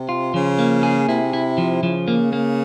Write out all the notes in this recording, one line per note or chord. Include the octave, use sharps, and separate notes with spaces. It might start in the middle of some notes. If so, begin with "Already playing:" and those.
Already playing: C3
F4
C#3 F3
A#3
G#4
C3 E4
E4
F3
C#3 F3
A#3
A#3